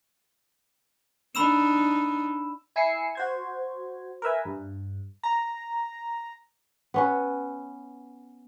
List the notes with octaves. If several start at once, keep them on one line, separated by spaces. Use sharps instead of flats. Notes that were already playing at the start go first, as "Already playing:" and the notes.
D4 D#4 B5 E6 E7
E4 G#5 E6 C7 C#7
F#4 C5 G#6
A#4 B4 E5 G#5
G2
A#5
B3 C#4 B4